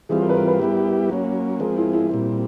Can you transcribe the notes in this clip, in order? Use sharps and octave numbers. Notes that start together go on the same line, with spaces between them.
E3 G3 C4 F4 G#4
A#4
B4
A#4
B4
G3 B3 E4 G4
F#3 A#3 C#4
F3 G#3 C4 A#4
E4
E4
A#2 G3 C4